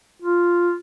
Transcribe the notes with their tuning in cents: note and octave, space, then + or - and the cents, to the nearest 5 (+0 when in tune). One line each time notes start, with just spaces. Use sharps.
F4 +0